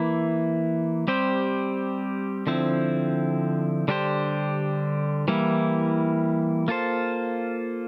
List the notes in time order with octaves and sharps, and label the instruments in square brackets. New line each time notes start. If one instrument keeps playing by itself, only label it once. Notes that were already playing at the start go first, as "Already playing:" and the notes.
Already playing: [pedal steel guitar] E3 A#3 E4
G3 C4 G4 C5
D3 F3 C4 E4
D3 G3 D4 G4 C5
E3 G3 A#3 E4
A#3 F4 A4 C5